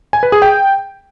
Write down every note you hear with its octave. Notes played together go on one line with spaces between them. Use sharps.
G#5
B4
G#4
G5